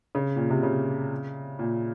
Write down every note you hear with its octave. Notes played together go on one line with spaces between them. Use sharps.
C#3
A#2
C3
C#3
A#2